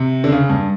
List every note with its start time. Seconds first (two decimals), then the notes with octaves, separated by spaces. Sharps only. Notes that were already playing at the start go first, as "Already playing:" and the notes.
Already playing: C3
0.24 D3
0.32 C#3
0.49 G2